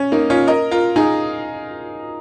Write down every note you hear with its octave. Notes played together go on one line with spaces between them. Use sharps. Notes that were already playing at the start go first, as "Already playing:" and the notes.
Already playing: C#4
A#3 D#4
C#4 F4
A#4 D#5
F4 A#4
D#4 G#4